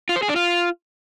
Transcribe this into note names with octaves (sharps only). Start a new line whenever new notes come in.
F4
C5
G#4
D4
F4